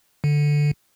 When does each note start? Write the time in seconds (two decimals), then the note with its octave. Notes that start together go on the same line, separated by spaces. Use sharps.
0.24 D3